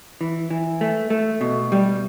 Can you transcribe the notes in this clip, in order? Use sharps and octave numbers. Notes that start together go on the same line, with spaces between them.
E3
E3
A3
A3
B2
G3